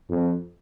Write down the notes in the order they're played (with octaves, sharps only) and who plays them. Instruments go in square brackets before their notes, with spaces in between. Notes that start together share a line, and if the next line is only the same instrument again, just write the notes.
[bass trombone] F2